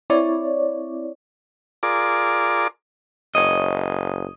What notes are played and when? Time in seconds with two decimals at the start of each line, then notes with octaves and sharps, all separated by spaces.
0.10 C4 E4 C#5 D5
1.83 F4 G#4 A#4 D5 D6
3.35 F#1 C#5 D#5